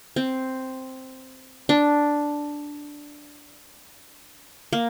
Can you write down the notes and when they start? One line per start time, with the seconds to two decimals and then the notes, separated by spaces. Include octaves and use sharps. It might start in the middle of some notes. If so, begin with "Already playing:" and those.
0.16 C4
1.69 D4
4.73 A#3